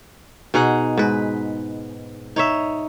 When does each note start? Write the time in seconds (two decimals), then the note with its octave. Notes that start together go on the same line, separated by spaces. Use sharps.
0.54 B2 D#4 G#4 F#5
0.97 G#2 B4
2.36 D#4 C#5 E5